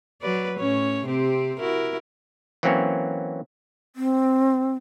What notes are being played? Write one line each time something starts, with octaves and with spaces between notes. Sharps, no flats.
F#3 B4 D5
A2 C#4 C#5
C3 C4 G4
E4 F#4 A#4
E3 F#3 A#3 C4 C#4 C#5
C4